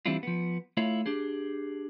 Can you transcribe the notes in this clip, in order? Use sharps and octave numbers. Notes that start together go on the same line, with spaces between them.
E3 G3 C4 D4 E4 F4
F3 B3
A3 E4 F4 A4 C#5 F5
D4 G4 G#4